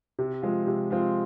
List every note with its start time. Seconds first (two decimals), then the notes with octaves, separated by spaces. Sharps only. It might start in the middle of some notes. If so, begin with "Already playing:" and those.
0.19 C3
0.42 F3 G#3 C4 F4
0.67 C3
0.90 F3 G#3 C4 F4